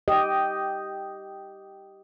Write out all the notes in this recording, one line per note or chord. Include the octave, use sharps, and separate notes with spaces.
G4 D#5